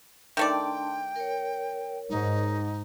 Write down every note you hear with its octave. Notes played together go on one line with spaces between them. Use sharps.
D#3 A3 D4 D5 G5 A5 C6
A#4 C#5
G#2 D#4